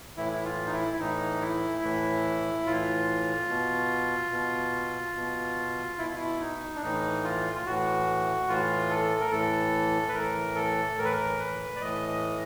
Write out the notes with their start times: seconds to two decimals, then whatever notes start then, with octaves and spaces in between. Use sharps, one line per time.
0.17 A2 E3 E4
0.32 E4
0.44 F4
0.66 D#4
0.72 E4
0.93 E4
1.00 A2 E3 D#4
1.41 E4
1.82 A2 E3
2.66 A2 E3 F4
3.49 B2
4.32 B2
5.16 B2
5.98 B2 E4
6.07 F4
6.16 E4
6.40 D#4
6.76 D4
6.81 A2 E3 D#4
7.24 F4
7.55 F4
7.65 A2 E3 F#4
8.48 A2 E3 F4
8.90 A4
9.20 A#4
9.31 A2 E3 A4
10.09 B4
10.14 A2 E3 A#4
10.56 A4
10.98 A2 E3 A#4
11.05 B4
11.13 A#4
11.39 B4
11.76 D5
11.81 A2 E3 D#5
12.09 D#5